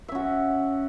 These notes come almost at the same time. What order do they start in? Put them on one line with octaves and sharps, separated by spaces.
E5 C#4 F#4